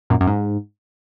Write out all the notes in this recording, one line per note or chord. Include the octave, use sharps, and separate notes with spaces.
F#2 A#2
F#2
G#2